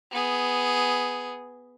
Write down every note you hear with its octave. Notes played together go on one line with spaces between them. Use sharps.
B3 G#4